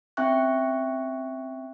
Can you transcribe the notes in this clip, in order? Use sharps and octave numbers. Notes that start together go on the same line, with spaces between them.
C4 C#4 E5 G5 C#6 F#6